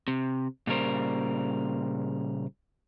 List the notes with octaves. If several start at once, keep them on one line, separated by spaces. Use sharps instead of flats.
C3
A#2 C#3 G3 A#4 C5